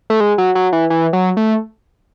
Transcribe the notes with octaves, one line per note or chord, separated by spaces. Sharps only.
A3
G#3
F#3
F#3
E3
E3
F#3
A3